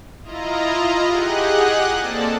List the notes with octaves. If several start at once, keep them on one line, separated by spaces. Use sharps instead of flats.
E4 F4 D#5 A#5
G4 G#4 D#5 F#5 F#6
A#3 C4 A4 D5 A5